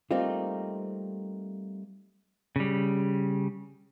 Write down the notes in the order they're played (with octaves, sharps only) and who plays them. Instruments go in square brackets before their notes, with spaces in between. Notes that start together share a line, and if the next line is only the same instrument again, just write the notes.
[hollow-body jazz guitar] G3 A3 A#3 C4 D#4 F4
[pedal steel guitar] C#3 G3